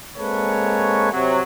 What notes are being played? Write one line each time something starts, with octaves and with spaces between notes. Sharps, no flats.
G#3 A#3 C4 A4 B4 C#5
C3 F#3